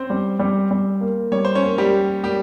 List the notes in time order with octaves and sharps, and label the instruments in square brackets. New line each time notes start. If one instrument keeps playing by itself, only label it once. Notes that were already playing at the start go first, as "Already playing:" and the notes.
Already playing: [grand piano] C4 C#4 C5
[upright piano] G3
G3
G3
A#3
[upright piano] G3 [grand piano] C#5
[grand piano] C5
C#4 C#5
[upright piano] A#3
[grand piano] G3 G4
[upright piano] A#3
[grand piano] G3 G4 [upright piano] A#3